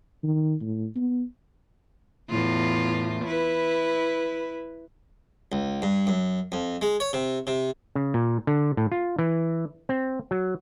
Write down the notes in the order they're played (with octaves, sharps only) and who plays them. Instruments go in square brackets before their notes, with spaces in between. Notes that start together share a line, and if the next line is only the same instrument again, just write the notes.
[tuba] D#3
A2
B3
[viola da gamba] E2 A2 F4
E4 B4
[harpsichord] C#2
G2
F#2
F2
G#3
C#5
C3
C3
[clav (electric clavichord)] C#3
A#2
D3
A2
F4
E3
C4
F#3